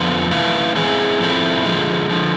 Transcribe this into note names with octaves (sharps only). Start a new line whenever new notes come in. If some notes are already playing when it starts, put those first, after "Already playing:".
Already playing: F2 D3 F3 B3 F4
E3 A3 E4 B4 F5
G#3 C4 E4 G#4
A2 F3 A3 C4 E4
D3 F3 G#3
D3 F3